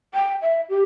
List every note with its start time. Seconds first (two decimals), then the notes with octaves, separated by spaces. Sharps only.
0.14 G5
0.42 E5
0.69 G4